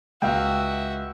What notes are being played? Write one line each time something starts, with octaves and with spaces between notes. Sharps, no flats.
C#2 F#4 E5 F5 G5